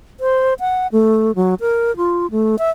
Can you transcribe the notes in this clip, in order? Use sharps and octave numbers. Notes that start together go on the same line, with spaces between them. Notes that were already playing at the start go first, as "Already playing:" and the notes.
C5
F#5
A3
F#3
A#4
F4
A3
E5